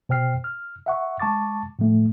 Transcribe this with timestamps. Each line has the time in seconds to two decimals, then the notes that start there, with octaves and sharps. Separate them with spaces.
0.09 B2 C5 G5 F6 C7
0.44 F6
0.86 E5 F#5 C#6
1.20 G#3 A5 C#6 D6 A6
1.79 A2 F3 A3